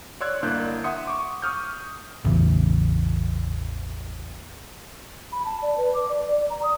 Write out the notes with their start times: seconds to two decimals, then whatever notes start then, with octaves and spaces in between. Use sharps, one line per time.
0.21 C#5 D5 C6 E6 F#6 G#6
0.43 G1 A#3 D4 E4 F#6 G6
0.84 E5 F#5 C6 D#6 C#7
1.07 C#6 D6
1.42 C#6 D#6 F6 G6
2.25 A1 E2 C#3 E3
5.32 B5
5.46 A5
5.62 D5
5.78 B4
5.94 D6
6.09 D5
6.27 D5
6.50 A#5
6.63 D#6